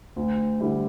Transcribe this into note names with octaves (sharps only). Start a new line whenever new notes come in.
D2
D3 G3 E4